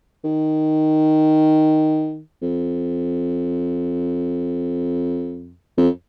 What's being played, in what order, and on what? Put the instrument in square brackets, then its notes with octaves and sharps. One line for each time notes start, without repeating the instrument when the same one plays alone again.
[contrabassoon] D#3
F2
F2